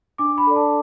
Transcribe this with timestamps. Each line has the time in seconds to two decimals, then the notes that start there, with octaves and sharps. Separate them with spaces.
0.18 D4 D6
0.38 B5
0.47 A4 D5
0.56 A5